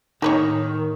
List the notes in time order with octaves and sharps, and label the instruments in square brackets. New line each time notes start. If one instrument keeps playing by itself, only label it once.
[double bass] A2 [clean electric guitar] D#3 [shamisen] A#3 B4 C#5 [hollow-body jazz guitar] D#4